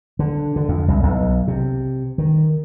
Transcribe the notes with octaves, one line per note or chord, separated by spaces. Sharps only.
D3
D3
F2
C2
B1
C3
D#3